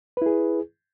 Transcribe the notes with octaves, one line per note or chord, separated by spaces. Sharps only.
E4 G#4 B4